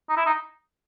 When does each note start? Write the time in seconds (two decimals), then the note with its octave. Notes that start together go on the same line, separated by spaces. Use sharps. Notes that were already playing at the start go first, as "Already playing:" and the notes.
0.09 D#4
0.17 E4
0.26 D#4